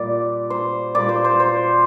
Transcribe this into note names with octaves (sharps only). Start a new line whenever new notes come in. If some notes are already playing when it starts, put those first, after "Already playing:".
Already playing: A#2 G3 D5
C5
A#2 G3 D5
C5
C5
C5